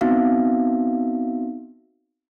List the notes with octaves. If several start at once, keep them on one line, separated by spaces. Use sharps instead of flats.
B3 C4 D#4 F#4 E5 F5